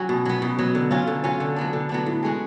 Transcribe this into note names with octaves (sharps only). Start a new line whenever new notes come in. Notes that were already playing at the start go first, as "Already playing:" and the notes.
Already playing: F#3 C#4 F#4
B2
F#3 B3
B2
F#3 B3
D3
F#3 C#4 F4
D3
F#3 C#4 F4
D3
F#3 B3 D4
D3
F#3 B3 D4
A2
G#3 C#4 F#4